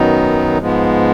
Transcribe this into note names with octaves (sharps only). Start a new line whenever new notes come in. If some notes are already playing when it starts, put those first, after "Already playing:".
Already playing: F#2 D#3 F#3 B3 D#4
G#2 F3 G#3 B3